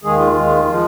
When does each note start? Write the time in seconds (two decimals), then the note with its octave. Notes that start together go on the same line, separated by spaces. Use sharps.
0.03 D#2 D#3 G#3 G#4
0.19 F4
0.35 D#2 D#3 G#3
0.68 F3 G#3